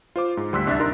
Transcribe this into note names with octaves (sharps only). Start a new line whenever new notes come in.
F4 C5 D6
G#2
D2 G3 C6 E6 F#6 B6
C2 D4 E5 F#6 A6
D#4 A#4 C6